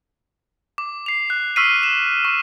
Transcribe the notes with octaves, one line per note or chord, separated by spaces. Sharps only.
D6
C7 F7
F#6
C#6 E6 F6 B6 C7 D#7
E7
C#6